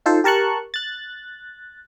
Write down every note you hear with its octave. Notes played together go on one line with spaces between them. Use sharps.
D#4 F4 A4 C5
G4 A#4 A5 C#6 F#6
F#6 A6